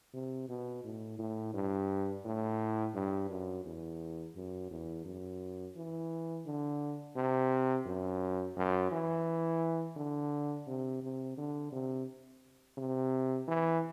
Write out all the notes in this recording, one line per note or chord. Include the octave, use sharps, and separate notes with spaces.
C3
B2
A2
A2
G2
A2
G2
F#2
E2
F#2
E2
F#2
E3
D3
C3
F#2
F#2
E3
D3
C3
C3
D3
C3
C3
E3